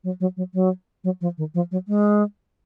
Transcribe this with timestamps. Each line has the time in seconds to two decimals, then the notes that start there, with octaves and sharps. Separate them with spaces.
0.04 F#3
0.20 F#3
0.37 F#3
0.54 F#3
1.04 F#3
1.21 F3
1.38 D#3
1.54 F3
1.71 F#3
1.88 G#3